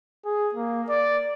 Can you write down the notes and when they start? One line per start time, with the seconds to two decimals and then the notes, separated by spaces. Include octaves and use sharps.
0.25 G#4
0.54 A#3
0.89 D5